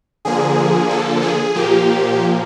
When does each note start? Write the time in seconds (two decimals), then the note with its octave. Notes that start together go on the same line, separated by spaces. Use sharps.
0.25 D3 F3 A#3 G#4
0.90 A4
1.22 G#4
1.55 A#2 F3 A#3 G4